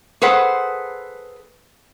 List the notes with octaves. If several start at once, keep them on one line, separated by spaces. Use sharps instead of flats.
G#4 A4 B4 C5 F#5